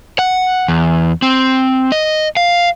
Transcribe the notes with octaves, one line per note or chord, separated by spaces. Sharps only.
F#5
E2
C4
D#5
F5